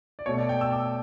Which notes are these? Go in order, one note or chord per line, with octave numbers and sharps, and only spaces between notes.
D5
B2 A3 C#5
D5
G5
E6
D6